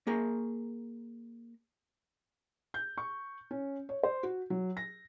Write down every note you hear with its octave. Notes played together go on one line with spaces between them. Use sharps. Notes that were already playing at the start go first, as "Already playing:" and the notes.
A#3 G#4 A#5
G6
C#6
C#4
C#5
C5
F#4
F#3
A#6